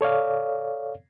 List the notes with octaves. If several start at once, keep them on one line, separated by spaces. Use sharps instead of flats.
A4 C#5 D5 F5